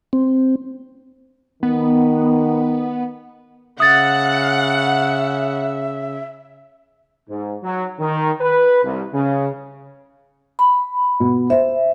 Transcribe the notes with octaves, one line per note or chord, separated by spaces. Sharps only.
C4
D#3 B3
C#3 E5 F#5 D#6 A6
G#2
F#3
D#3
B4
C2
C#3
B5
B2
C5 E5